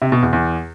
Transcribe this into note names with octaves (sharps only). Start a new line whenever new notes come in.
C3
B2
E2
E2